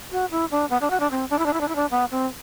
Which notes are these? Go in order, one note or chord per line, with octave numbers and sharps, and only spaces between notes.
F#4
E4
D4
B3
D4
F#4
D4
C4
D4
E4
D4
E4
D4
E4
D4
B3
C4